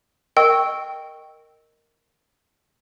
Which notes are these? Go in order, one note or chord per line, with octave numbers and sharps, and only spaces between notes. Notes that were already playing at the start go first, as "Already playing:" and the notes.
A#4 D#5 G5 C#6 E6